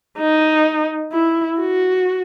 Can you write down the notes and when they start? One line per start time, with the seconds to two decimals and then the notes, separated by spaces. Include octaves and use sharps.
0.18 D#4
1.12 E4
1.60 F#4